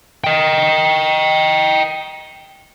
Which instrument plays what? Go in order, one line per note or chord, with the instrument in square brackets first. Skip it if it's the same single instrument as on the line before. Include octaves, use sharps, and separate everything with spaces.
[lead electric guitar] D#5 G5